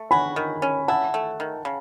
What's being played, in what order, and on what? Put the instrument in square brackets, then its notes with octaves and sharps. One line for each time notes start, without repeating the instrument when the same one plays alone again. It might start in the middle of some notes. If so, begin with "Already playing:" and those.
Already playing: [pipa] A3
[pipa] F#4 [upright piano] G#5 B5
[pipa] D#3
C#4
[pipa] E4 [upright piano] F#5 A5
[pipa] A3
D#3
C#3